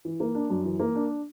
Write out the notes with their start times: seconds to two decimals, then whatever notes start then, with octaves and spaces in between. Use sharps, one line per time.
0.05 E3
0.20 A#3
0.35 D4
0.50 F#2
0.65 E3
0.80 A#3
0.95 D4